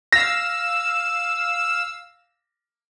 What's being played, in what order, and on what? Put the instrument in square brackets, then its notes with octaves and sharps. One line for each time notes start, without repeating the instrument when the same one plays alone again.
[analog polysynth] F5 E6 [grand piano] A#6